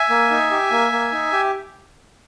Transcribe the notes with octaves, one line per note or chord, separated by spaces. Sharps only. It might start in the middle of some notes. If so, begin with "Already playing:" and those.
Already playing: E5 G#5
A#3
D#4
G4
A#3
A#3
D#4
G4